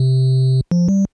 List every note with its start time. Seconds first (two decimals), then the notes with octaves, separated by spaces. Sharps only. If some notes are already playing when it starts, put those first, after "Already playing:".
Already playing: C3
0.71 F3
0.89 G3